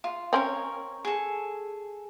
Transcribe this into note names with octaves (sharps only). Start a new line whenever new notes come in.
F4
C4 C#4 A#4 C#5
G#4 A4